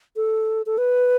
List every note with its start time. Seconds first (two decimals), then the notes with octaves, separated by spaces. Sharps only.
0.16 A4
0.66 A4
0.78 B4